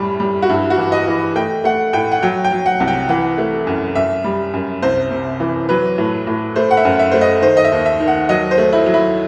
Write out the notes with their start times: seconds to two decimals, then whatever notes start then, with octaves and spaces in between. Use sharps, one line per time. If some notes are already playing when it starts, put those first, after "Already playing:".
Already playing: F#2 A2 G3
0.20 G3
0.42 F#4
0.49 G2 E4
0.70 F#4
0.78 E3
0.92 D#5
1.07 E3
1.36 A3 G5
1.64 A3 F#5
1.93 A2 G5
2.12 F#5
2.23 F#3 G5
2.44 G5
2.52 F#3
2.66 F#5
2.80 C2
2.88 G5
3.09 E3 F#5
3.38 A3
3.67 F#2
3.95 F#2 E5
4.24 G3
4.54 F#2
4.82 C2 C5
5.11 C3
5.40 E3
5.69 F#3 B4
5.98 A2
6.27 A2
6.56 A3 C5
6.71 F#5
6.77 E5
6.85 F#2
6.99 E5
7.11 A3 C5
7.21 D#5
7.42 D#3 C5
7.57 D#5
7.64 E5
7.72 D#2
7.86 E5
8.00 D#3
8.08 F#5
8.29 F#3 D#5
8.51 C5
8.58 A3
8.73 E4
8.86 F#3
8.94 E4